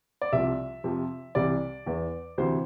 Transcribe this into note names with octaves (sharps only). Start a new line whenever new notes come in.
D5
C2 C3 F3 E5
F2 C3 F3
C2 C3 E3 D5
E2 E3
D2 C3 E3 C5